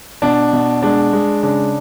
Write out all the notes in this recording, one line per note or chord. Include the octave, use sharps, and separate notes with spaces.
B2 D4
B2
G#3 D4
G#3
C#3 D4